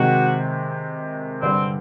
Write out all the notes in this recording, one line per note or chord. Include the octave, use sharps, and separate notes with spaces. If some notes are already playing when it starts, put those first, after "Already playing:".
Already playing: C3 D#3 G#3 C4 F#4
G2 D3 G3 C4